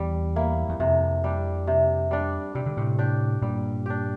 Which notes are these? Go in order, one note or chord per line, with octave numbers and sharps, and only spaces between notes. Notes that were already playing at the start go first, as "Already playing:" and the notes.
Already playing: E2 G3
A#3 E4
E2
F2 C3
G3 D4
C3
G3 D4
C3 G3
D3
A2 C3
D4 G4
G2 A#2 G3
D4 G4